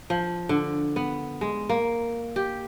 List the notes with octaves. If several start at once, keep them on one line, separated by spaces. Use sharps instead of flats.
F3
D3
B3
G#3
A#3
G4